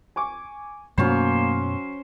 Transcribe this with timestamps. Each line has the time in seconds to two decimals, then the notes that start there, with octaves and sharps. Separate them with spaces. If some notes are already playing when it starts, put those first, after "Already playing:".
0.16 G#5 C#6 D6
0.98 F#2 B2 F#3 A3 A#3 C#4 C5 C#6